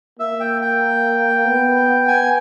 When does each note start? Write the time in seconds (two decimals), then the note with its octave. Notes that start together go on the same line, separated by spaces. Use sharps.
0.19 A#3 E5
0.40 G5
0.62 G5
1.45 B3
2.08 G#5